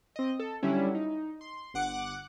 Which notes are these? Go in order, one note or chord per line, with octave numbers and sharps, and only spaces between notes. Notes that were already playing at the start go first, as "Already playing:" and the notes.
C4 D#5
A4
D3 F#3 G3 C#4 E4
D#4
C6
G1 F#5 D6 F#6